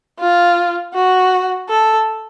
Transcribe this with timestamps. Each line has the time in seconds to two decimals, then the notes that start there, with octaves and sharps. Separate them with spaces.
0.19 F4
0.94 F#4
1.69 A4